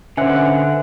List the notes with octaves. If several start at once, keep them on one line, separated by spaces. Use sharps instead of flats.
D3 C#4 B4 C5 E5 F#5 G#5